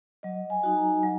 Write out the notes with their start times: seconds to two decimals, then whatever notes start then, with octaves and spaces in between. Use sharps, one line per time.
0.23 F#3 D#5
0.50 G#5
0.63 D#4 F#4
0.77 A#5
1.03 F#3